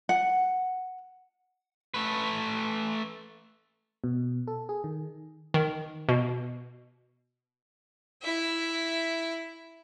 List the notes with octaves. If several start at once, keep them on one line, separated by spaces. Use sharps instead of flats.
F#5
A3 B4
B2
A4
G#4
D#3
D#3
B2
E4 E5